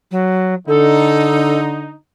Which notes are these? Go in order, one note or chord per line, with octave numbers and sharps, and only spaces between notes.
F#3
D3 D#4 A4